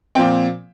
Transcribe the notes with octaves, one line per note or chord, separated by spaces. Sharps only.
A#2 F3 C4 G5